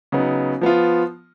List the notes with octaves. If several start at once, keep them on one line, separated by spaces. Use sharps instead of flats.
C#3 F#3 B3 D#4
F3 B3 F4